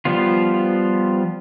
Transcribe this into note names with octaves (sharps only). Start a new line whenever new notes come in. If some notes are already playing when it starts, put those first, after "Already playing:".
F3 G3 B3 F4